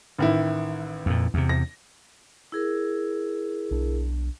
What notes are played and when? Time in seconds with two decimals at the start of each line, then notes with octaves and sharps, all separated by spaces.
0.19 A1 D#3 E4
1.06 F2 A#2
1.34 E2 C3
1.49 A#6
2.52 E4 G#4 A#4
3.71 B1 D4